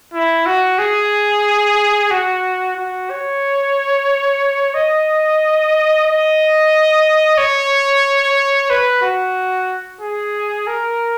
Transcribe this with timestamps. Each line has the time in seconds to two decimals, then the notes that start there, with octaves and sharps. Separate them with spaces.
0.14 E4
0.46 F#4
0.78 G#4
2.11 F#4
2.76 F#4
3.10 C#5
4.74 D#5
6.06 D#5
7.38 C#5
8.70 B4
9.02 F#4
10.01 G#4
10.67 A#4